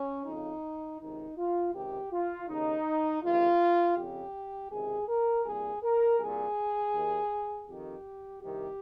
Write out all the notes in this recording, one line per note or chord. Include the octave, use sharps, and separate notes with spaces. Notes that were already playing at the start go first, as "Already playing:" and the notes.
Already playing: C#4
F2 C#3 D#4
C#2 C3 D#3 D#4
F4
C#2 C3 D#3 G4
F4
D#2 C#3 D#4
C#2 C3 D#3 F4
F2 C#3 G4
C#2 C3 D#3 G#4
A#4
C2 A#2 G#4
A#4
C2 A#2 G#4
D#2 D#3
F2 D#3 G4
C2 C3 D#3 G4